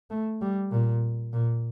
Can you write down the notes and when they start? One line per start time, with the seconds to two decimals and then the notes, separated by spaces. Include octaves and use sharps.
0.10 A3
0.42 G3
0.71 A#2
1.33 A#2